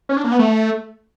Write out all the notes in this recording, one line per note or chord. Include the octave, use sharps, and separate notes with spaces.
C#4
D4
A#3
B3
A3